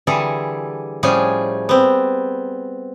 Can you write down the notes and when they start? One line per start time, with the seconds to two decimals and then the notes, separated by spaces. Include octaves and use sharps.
0.07 D3 E3 G3 G#4 A4
1.03 A2 F3 G3 C#4 G#4
1.69 B3 C4